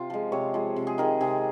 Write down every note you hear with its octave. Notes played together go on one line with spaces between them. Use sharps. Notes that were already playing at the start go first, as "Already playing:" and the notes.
Already playing: C3 F4
F3 G#3
C3 C#5
F3 G#3
C3
G#4
D#3 G#3 A#4
C3 G#4